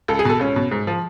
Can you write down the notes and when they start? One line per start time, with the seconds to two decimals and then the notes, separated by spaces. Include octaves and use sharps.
0.08 C#2 A4
0.19 G#4
0.25 B2 A4
0.40 C#2 C#4
0.56 B2
0.71 G#2
0.87 F3